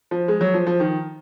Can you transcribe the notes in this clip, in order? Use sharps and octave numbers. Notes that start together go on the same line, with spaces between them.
F3
G#3
F#3
F3
F3
D#3